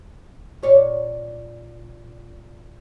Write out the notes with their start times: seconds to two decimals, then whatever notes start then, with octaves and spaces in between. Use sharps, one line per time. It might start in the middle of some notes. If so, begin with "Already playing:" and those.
0.62 A#2 C#5 D5